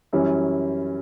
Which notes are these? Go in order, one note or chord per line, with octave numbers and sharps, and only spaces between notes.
F#2 E3 G3 C#4 E4